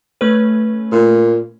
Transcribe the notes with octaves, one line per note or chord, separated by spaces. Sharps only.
A3 C#4 B4
A#2